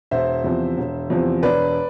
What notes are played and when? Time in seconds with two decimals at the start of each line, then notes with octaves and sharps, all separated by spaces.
0.11 E1 C5 E5
0.44 E2 C3 F3
0.77 E1
1.10 E2 C3 F3
1.43 E1 B4 D5